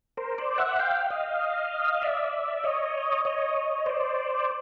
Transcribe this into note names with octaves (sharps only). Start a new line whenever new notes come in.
A#4 C5
C5 D5
E5 F#5
F5 G5
D#5 F5
D5 E5
C#5 D#5
C#5 D#5
C5 D5